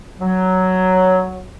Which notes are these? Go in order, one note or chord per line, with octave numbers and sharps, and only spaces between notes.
F#3